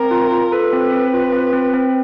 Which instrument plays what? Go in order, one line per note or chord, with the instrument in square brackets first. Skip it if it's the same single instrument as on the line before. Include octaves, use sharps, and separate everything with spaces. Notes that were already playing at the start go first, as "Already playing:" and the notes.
Already playing: [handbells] C4 [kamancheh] A#4
[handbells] F4
F4
[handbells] A4 [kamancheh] B4
[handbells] C4
C4
F4
C4
C4
C4